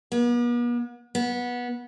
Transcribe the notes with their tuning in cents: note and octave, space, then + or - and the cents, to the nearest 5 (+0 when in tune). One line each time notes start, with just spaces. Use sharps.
B3 -45
B3 -20